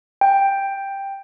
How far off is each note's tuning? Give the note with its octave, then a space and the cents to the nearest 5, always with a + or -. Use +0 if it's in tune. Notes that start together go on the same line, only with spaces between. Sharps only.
G5 +5